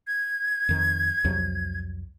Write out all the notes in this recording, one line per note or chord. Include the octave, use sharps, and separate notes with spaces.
G#6
F2 D#3
C2 F2 F#3